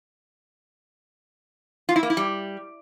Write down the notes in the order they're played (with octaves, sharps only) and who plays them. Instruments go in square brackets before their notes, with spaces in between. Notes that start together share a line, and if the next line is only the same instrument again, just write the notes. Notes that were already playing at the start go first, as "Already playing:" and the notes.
[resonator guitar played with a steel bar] F4
E4
A#3
E4
G3